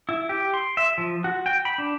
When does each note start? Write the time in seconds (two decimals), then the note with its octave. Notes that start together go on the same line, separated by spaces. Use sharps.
0.09 E4
0.29 G4
0.54 C6
0.77 E5
0.98 F3
1.24 F#4
1.46 G5
1.65 B5
1.78 D4